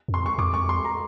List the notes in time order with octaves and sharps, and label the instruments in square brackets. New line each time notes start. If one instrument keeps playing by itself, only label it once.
[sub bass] F2
[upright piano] C6
C#6
[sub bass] F2 [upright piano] D6
[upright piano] C#6
C6
A#5